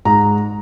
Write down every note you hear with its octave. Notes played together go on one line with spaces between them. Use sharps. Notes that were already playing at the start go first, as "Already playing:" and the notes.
G#2 A#5